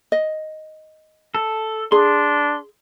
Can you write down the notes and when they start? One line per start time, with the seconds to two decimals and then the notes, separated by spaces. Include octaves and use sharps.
0.12 D#5
1.35 A4
1.92 D4 G#4 C6